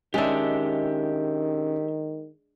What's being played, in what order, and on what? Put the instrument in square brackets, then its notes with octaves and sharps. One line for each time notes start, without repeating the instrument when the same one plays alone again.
[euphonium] D#3 [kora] G#3 D4 [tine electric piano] C#4 G#4 [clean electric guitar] G4 E5